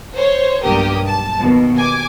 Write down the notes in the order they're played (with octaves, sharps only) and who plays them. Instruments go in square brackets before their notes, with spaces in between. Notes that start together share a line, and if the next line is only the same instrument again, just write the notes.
[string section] C5 C#5
B1 G2 A#3 G4 A#4 D#6
A5
D#2 B2
G#5 D6